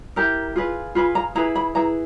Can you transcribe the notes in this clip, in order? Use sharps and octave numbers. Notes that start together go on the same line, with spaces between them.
E4 G4 A#4 A#5
F4 G#4 B4
F4 G#4 B4 B5
A#5
E4 G#4 B4 A#5
B5
E4 G#4 B4 A#5